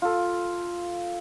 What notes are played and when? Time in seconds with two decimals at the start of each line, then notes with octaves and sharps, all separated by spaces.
0.02 F4 A4